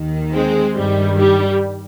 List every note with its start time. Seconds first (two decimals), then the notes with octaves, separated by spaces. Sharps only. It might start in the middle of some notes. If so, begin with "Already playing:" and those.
Already playing: D#2 D#3
0.34 G#3 C4
0.76 G2 D#3 G3
1.19 G3